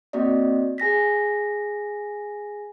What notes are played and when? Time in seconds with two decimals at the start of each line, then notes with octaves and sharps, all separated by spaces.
0.13 A#3 C4 F#4 D5 D#5
0.78 G#4 G#5 A#6 B6